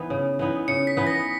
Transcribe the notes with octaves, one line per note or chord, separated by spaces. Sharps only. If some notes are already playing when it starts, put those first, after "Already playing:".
Already playing: E3 B3 D#4
C#3
E3 B3 D#4
C#3 C#7
B6
E3 B3 D#4
A#6